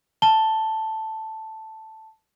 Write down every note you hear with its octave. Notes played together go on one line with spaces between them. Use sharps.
A5 G7